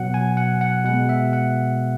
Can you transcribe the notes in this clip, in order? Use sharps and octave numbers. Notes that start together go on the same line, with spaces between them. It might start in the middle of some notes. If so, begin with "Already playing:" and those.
Already playing: B2 F#3 F#5
G#5
F#5
F#5
B2 G#3 F#5
E5
F#5